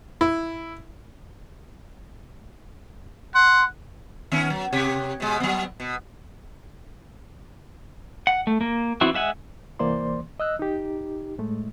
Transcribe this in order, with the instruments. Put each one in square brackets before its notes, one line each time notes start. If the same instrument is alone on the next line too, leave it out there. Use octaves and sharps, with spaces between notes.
[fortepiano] E4
[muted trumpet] F#5 [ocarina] C6
[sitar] D#3 B3 C#4
F#3
C3 G4 C#5
B2 G#3
F#3 B3
B2
[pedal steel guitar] F#5
A3
A#3
E3 B3 C4 E4 F#4
G#3 E5 F#5 G#5
[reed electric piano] C2 E3 A#3 C5 D5 C6
D#5 E6 F#6
D#4 G4
A2 G#3 A3